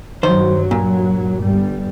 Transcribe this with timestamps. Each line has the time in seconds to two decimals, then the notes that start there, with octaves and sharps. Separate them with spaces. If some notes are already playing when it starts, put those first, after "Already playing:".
0.23 G2 D#3 F#3 C5
0.71 A#2
1.41 G1 G2 G3